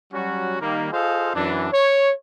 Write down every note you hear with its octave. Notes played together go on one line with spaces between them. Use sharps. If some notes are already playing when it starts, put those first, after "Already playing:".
F#3 G3 C#4 F#4
D#3 G3 A#3
F4 G#4 A4 C5 D#5 F5
F#2 E3 D4
C#5